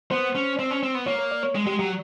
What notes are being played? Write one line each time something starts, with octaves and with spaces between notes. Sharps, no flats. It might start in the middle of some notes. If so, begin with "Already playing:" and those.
B3 C5
C#4
C4
C#4
C4
B3
A#3 C#5
C#5
D5
C#5
G#3
G#3 G4
F#3 G4